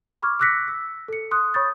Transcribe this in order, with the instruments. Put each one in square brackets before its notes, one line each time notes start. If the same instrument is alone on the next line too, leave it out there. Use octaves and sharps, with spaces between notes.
[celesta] B5 C#6 D6 F6 G#6
D6 E6 F#6 A#6 B6 C#7
E6
A4 C#7
C6 D#6 F#6
C#5 B5 C#6 D#6 G6 A6